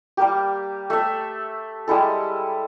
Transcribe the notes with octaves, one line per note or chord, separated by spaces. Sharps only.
G3 A#3 G4
A3 E5
G3 G#3 E4 A4